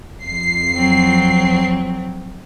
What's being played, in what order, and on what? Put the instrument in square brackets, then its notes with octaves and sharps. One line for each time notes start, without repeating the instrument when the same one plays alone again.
[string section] F2 C7
[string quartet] F#3 C4